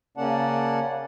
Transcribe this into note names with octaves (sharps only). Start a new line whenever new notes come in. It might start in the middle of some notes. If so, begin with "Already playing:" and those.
C#3 A#3 C#4 D5 F#5 A5